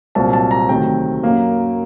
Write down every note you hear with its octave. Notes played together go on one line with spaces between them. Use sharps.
C2 A#2 F#3 C4 A5
A5
A#5
D2 C3 D#3 F#3 G5
F#2 F#3 A#3